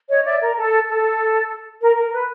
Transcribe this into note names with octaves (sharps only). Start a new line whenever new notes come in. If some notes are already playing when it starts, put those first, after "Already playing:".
C#5 D#5
D5 E5
A#4
A4
A4
A#4
A#4
B4